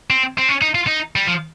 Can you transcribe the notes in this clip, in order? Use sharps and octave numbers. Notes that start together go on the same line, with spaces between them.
C4
C4
C#4
D#4
F4
D#4
G3
F3